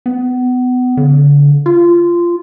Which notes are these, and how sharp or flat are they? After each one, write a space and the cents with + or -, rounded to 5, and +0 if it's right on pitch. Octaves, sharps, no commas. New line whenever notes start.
B3 +25
D3 -35
F4 -15